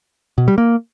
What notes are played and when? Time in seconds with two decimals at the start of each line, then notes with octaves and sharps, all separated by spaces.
0.38 B2
0.48 G3
0.58 A#3